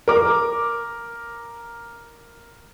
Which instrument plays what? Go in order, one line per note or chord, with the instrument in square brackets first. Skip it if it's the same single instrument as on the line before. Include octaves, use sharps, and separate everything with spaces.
[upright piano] A#4 D6